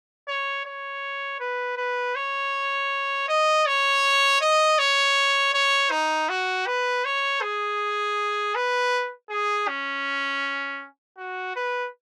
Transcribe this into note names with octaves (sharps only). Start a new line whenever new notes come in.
C#5
C#5
B4
B4
C#5
D#5
C#5
D#5
C#5
C#5
D#4
F#4
B4
C#5
G#4
B4
G#4
C#4
F#4
B4